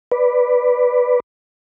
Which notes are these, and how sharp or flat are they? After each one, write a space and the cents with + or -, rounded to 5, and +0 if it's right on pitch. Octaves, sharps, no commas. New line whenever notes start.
B4 +0 D5 +0